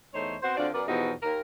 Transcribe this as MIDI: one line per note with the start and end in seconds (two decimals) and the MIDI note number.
0.14 0.35 40
0.14 0.35 57
0.14 0.35 63
0.14 0.35 72
0.14 0.35 73
0.42 0.55 59
0.42 0.55 60
0.42 0.55 66
0.42 0.55 72
0.57 0.67 50
0.57 0.67 60
0.57 0.67 62
0.57 0.67 65
0.57 0.67 66
0.57 0.67 74
0.73 0.83 42
0.73 0.83 59
0.73 0.83 70
0.73 0.83 74
0.87 1.12 40
0.87 1.12 47
0.87 1.12 53
0.87 1.12 63
0.87 1.12 66
0.87 1.12 67
1.23 1.40 39
1.23 1.40 70